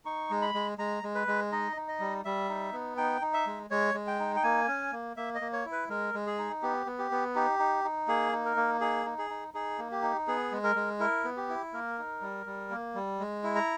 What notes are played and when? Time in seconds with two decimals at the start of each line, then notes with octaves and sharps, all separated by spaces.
0.05 D#4 C#6
0.31 G#3
0.42 B5
0.54 G#3
0.78 G#3 A#5
1.03 G#3
1.15 B4
1.27 G#3
1.52 D#4 D#5
1.77 D#4
1.88 D#5
2.00 G3
2.25 G3 E5
2.49 D#4
2.73 B3
2.97 D#4 G5
3.21 D#4
3.33 E5
3.47 G#3
3.70 G#3 C#5
3.94 G#3
4.07 G5
4.19 D#4
4.36 G5
4.43 A#3 G#5
4.68 C#4
4.92 A#3
5.17 A#3 E5
5.35 D#5
5.41 A#3
5.53 C#5
5.66 E4
5.72 B4
5.89 G#3 A#4
6.14 G#3
6.27 G#4
6.38 D#4
6.62 B3 G4
6.86 B3
6.99 G4
7.11 B3
7.35 D#4 G4
7.59 D#4
7.84 D#4
8.08 A#3 G#4
8.32 D#4
8.45 A#4
8.56 A#3
8.81 D#4 G#4
9.06 D#4
9.18 G#4
9.30 D#4
9.54 D#4 G#4
9.78 A#3
9.91 G4
10.02 D#4
10.27 B3 G#4
10.52 G#3
10.64 A#4
10.75 G#3
11.00 E4 A#4
11.24 B3
11.37 G4
11.49 E4
11.73 A#3 A#4
11.98 D#4
12.21 G3
12.46 G3
12.70 A#3
12.95 G3
13.19 G#3
13.44 E4
13.55 A#5